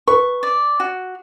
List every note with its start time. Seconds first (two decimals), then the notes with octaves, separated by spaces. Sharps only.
0.08 B4 C#6
0.43 D5
0.80 F#4